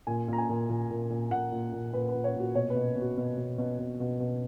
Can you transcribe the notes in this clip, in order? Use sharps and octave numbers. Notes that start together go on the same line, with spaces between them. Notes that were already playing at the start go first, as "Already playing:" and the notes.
A#2 G#5
A#2 A#5
G#5
A#2
A#2
A#2
A#2
A#2 F#5
A#2
A#2
A#2 B4
B4
A#2
C#5
A#2 F#4
B2 C#5
B4
B2
B2
F#4
B2
B2
B2
B2
B2
B2